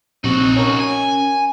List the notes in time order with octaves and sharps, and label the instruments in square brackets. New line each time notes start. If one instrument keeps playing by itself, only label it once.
[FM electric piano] A#1 C3 [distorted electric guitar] D#4 F#4
[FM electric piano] C#4 A#4
[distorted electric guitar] G#5